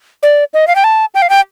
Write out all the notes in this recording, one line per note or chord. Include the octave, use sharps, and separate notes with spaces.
D5
D#5
F5
G5
A5
G5
F5
G5